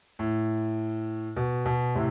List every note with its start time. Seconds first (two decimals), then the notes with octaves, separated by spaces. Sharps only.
0.19 A2
1.36 B2
1.65 B2
1.95 A2 C3